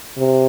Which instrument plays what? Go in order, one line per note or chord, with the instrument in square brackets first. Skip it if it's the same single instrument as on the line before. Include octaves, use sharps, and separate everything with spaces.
[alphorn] C3